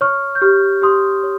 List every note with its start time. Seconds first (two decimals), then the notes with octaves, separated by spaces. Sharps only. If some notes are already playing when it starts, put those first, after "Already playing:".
0.01 C#5 C#6 F6
0.35 G6
0.42 G4 C#6 F6
0.82 G4 C6 D#6
1.23 C#5